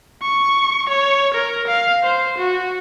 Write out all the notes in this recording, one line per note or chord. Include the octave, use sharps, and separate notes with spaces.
C#6
C#5
A#4
F5
C5
F#4